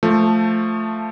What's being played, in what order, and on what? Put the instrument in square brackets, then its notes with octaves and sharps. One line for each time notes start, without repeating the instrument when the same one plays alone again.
[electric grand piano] F3 A3